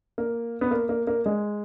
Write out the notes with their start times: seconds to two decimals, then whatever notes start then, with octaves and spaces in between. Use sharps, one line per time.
0.18 A#3
0.61 B3
0.71 A#3
0.89 A#3
1.07 A#3
1.26 G#3